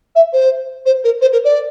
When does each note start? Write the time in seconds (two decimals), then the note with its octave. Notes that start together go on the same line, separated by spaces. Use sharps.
0.15 E5
0.33 C5
0.86 C5
1.04 A#4
1.21 C5
1.32 A#4
1.44 D5